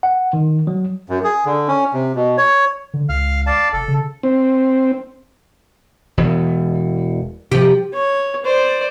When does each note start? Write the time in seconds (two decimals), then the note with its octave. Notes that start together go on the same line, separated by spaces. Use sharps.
0.03 F#5
0.33 D#3
0.67 F#3
1.09 F#2
1.24 G#4
1.46 D3
1.68 C#4
1.94 C3
2.15 B2
2.38 C#5
2.94 D3
3.09 C#2 F5 F6
3.47 D5 F5 A5
3.73 F1 A4
3.88 C#3
4.23 C4
6.17 E1 E2
7.52 C3 F3 G4
7.94 C#5
8.45 C5 D5